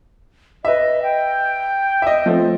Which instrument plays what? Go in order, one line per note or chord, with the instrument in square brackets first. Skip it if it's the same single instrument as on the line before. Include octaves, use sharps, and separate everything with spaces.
[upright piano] B4 E5 [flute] D#5
[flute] G5
[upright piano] D#5 E5
F3 A3 C4